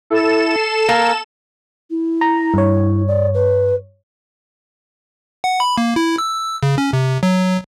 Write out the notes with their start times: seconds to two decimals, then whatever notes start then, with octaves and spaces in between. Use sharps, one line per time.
0.10 E4 A4 E7
0.56 C7
0.89 A#3 A5
1.91 E4
2.21 A#5
2.54 G2 C#5
3.08 D5
3.34 B4
5.44 F#5
5.60 B5
5.78 A#3
5.96 E4
6.18 E6
6.63 C#3
6.78 C#4
6.93 C3
7.23 F#3